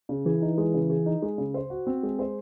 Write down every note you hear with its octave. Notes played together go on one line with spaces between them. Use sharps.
C#3
E3 G#4
D#4
G#3
C#3
G#4
D#4
G#3
C#3
C5
F#4
C4
G#3
C5